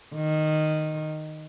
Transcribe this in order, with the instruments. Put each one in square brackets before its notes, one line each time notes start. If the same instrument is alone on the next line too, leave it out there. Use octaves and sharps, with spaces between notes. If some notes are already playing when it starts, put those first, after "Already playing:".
[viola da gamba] D#3